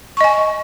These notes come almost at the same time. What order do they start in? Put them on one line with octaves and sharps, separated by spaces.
C#6 D#5 G#5